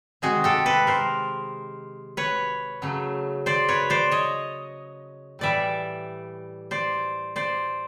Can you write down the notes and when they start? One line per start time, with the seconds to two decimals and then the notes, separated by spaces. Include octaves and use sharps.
0.22 C3 D#3 G#3 F#4 G#4
0.44 G4 A4
0.66 A4 B4
0.87 A#4 C5
2.17 B4 C#5
2.82 C#3 F#3 A3
3.46 C5 D5
3.68 B4 C#5
3.90 C5 D5
4.11 C#5 D#5
5.39 A2 E3 G3 D5 E5
6.71 C5 D5
7.36 C5 D5